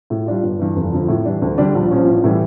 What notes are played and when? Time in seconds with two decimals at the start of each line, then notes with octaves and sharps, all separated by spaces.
0.10 A2
0.26 G3 D4 F4
0.43 G1
0.59 G2 E3
0.76 F1
0.92 F2 D3
1.08 A2
1.25 E3 G3 D4
1.42 D2
1.58 D3 G3 D4 G4
1.75 A#1
1.91 A#2 F3 C#4
2.07 A1
2.24 A2 E3 G3